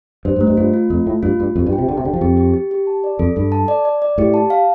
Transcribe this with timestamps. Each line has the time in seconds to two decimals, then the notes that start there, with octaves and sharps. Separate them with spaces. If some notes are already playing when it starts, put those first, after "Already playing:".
0.25 G2 C5
0.36 G2
0.41 A3
0.47 G2
0.57 G2 F4
0.73 F4
0.90 F2 A3
1.06 A2 A3
1.23 G2 F4
1.40 G2 F4
1.56 F2 G4
1.66 G2
1.73 G5
1.78 C3
1.88 D3 G4
1.97 C3
2.04 D3 G5
2.13 F3
2.21 F2 G4
2.37 G4
2.54 G4
2.71 G4
2.87 A5
3.04 D5
3.19 F2 A4
3.36 G2 A4
3.52 A5
3.68 D5
3.85 D5
4.02 D5
4.18 A2 G4
4.34 A5
4.50 F5